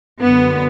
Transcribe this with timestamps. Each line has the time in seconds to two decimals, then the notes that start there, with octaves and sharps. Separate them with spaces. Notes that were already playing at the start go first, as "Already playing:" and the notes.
0.22 F#2 D3 B3